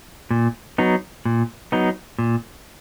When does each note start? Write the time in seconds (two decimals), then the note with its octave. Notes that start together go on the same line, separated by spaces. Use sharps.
0.31 A#2
0.78 F#3 B3 D#4
1.25 A#2
1.72 F#3 B3 D#4
2.19 A#2